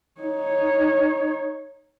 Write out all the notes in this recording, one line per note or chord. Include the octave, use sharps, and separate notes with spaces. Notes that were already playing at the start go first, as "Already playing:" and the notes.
D#4 C#5